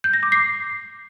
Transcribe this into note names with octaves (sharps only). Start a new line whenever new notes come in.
G6
A#6
D6
C7